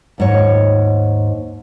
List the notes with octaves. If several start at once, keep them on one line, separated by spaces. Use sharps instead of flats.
D#2 G#2 C#5